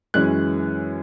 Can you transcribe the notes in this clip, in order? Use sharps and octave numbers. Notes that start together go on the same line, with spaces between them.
F#2 E3 G#3 C#4 F#6